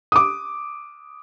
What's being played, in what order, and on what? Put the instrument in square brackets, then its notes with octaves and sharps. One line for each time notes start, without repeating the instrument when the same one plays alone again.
[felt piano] D6 D#6